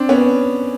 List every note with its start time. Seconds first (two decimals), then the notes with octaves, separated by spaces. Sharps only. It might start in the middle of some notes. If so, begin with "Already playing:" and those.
Already playing: C4 D4
0.09 B3 C#4